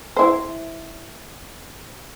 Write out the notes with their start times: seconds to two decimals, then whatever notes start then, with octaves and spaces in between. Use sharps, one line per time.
0.17 E4 C5